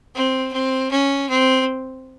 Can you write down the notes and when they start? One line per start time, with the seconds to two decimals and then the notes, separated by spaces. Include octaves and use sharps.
0.15 C4
0.52 C4
0.91 C#4
1.29 C4